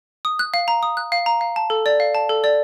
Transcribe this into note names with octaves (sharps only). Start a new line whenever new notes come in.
D#6
F#6
F5
A#5
D#6
F#6
F5
A#5
F5
A5
A4
D5
F5
A5
A4
D5